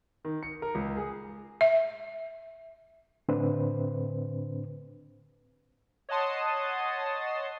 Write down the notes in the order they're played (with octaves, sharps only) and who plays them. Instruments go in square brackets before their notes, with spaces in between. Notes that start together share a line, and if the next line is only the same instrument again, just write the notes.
[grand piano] D#3
C#7
A#4
C#2
G#4
[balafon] E5
[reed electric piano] A2 D3 C4 D4 B4 C5
[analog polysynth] C#5 D#5 F#5 A5 C6 D#6